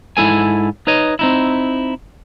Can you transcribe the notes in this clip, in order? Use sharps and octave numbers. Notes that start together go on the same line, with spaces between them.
G#2 E4 A4 G#5
D#4 B4 C#5 D#5
C4 D#4 E4